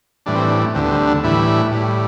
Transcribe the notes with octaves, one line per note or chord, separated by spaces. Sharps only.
A2 E3 G3 D4
C4
D4
D2 D3 G3 C4
B3
C4
D4
A2 E3 G3 E4
A2 G3